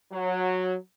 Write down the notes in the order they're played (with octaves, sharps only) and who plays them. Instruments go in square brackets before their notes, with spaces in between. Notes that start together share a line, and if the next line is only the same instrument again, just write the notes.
[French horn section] F#3